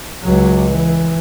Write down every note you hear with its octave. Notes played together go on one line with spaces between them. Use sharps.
C#2 F#3
E3